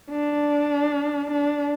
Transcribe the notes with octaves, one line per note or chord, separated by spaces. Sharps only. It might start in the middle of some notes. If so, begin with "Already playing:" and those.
D4
D4